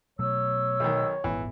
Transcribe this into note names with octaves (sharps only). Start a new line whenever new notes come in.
B2 F#3 A3 C#5 E6
B1 D#3
D#1 G#1 E3 B3